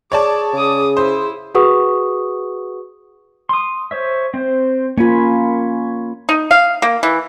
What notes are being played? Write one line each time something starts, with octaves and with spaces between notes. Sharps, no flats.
G#4 C#5 D5 A5 D6
C#3 D6 D#6
E4 C5
F#4 G#4 B4 F#5 C#6 D#6
C6 D#6
C5 C#5 E5
C4 C5
A#3 C#4 F4 G#5 B5
D#4
F5
A#3
E3